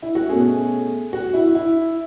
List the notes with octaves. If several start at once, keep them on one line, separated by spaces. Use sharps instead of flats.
E4
F#4
B2 A3 C#4 G#4
F#4
E4
E4